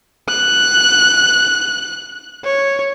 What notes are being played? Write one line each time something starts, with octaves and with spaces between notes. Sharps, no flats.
F#6
C#5